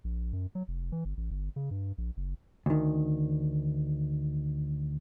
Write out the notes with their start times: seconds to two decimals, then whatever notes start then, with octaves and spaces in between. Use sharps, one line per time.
0.04 A#1
0.33 F#2
0.55 F#3
0.68 F1
0.92 E3
1.05 G1
1.17 A1
1.31 G1
1.56 C#3
1.71 G2
1.98 A#1
2.17 F#1
2.66 D2 D#3